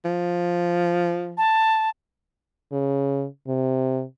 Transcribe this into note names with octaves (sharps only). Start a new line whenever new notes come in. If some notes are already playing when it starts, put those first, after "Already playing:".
F3
A5
C#3
C3